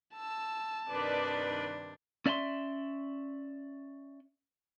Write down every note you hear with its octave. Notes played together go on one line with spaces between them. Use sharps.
A5 E6
G2 C3 D#3 D4 B4 D5
C#4 D5 E5 F#5 C6